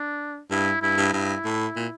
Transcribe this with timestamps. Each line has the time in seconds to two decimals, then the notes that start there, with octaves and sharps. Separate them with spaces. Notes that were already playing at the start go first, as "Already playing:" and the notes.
Already playing: D4
0.51 G2 E4
0.82 G2 E4
0.97 G2
1.13 G2 E4
1.45 A2
1.76 A#2